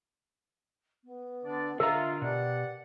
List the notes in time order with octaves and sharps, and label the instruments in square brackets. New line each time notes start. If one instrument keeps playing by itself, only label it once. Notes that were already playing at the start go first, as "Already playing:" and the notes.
[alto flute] B3
[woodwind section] D3 D4 D5
[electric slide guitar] D3 D#5 A#5 [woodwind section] F4 [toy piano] A#4 [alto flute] E5
[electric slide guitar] B2 [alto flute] G4 [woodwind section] D5 F#5